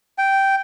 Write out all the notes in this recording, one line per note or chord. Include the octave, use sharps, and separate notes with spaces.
G5